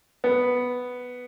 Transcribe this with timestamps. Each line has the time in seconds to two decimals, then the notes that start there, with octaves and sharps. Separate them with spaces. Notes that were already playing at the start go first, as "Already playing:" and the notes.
0.24 B3